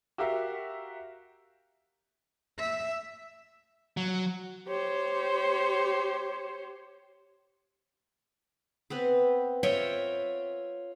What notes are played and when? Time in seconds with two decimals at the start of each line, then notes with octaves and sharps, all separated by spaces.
0.18 F#4 G4 A#4 E5 F5
2.59 E5
3.97 F#3
4.67 G4 C5 C#5
8.90 B3 C4 B4
9.63 F4 C#5 D#5 E5 G5